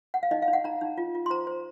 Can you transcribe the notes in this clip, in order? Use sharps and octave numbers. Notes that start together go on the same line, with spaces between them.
F#5
F5
D#4 D#5
F5
D#4
F#5
D#4 A#5
D#4
F4
F4
C6
C5 A#5
C5